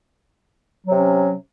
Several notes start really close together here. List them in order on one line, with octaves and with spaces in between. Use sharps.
F#3 C3 C#4